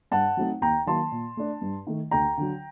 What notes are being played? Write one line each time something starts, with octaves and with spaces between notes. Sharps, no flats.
G2 F#5 A5
F#3 A3 C4 D#4
D#2 G5 A#5
D#3 F#3 A#3 A5 C6
A#2
A3 D4
G2
D#3 A3
D2 G5 A#5
D3 F#3